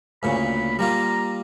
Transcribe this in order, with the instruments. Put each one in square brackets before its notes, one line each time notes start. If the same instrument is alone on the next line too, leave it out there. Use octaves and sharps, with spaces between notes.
[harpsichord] D2 A#2 C#3 [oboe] B5
[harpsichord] G3 A#3 F4 [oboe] A#5